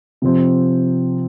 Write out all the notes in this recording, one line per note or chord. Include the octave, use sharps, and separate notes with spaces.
C3 F3 C4